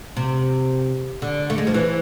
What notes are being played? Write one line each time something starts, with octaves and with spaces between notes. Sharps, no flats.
C3
D3
A3
G#3
F3
E3